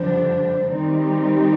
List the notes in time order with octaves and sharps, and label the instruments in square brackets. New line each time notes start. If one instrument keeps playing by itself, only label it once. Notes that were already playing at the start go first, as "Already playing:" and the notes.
Already playing: [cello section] F2 D3 G3 D4 [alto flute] C5
[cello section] D#3 G3 C4 D#4 G4 [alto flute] D5